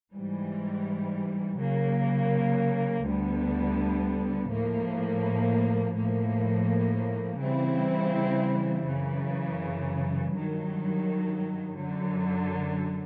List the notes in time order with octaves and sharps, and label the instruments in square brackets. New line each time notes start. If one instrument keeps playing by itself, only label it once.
[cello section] G#2 E3 G3
C#3 F#3 A#3
D2 D3 G3 B3
A2 F3 A#3
A2 F3 A#3
C#3 E3 G3 C4 E4
F#2 C#3 E3
G2 D#3 F#3
F#2 D3 F#3